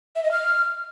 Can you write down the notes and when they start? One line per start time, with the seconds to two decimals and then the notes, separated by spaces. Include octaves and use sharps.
0.16 E5
0.24 D#5
0.31 F6